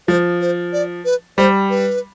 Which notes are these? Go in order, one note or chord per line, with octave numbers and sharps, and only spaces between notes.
F3 C5
C5
D5
B4
G3 C5
B4